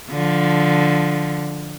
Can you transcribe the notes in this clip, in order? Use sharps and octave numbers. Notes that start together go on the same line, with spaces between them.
D3 F3